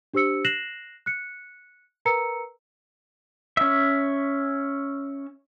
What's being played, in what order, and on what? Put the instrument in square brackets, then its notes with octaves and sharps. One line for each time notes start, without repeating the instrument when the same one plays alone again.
[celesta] D4 G4 C5 E6 C#7
F#6 A#6 C7 E7 F#7
F#6 C#7
A#4 B4 A#5 E6 C#7
[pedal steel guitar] C#4 E5